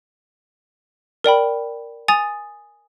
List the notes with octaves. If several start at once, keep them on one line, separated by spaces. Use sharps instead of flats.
A#4 D5 G5 B5
G#5 D#6 A6 F7